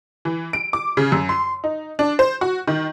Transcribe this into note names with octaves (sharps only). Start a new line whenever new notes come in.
E3
D7
D6
C#3
F#2
C6
D#4
D4
C5
F#4
D#3